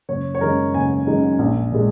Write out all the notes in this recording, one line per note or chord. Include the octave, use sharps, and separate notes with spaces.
F#1 C#5
C#5
F#2 D#3 G#3 D#4 A#4
F#1 G#5
F#2 D#3 G#3 D#4
A#1
A#2 G#3